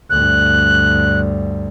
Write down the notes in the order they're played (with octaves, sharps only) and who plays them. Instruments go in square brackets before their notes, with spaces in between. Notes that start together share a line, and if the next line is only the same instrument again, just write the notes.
[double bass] D2 G2 [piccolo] F#6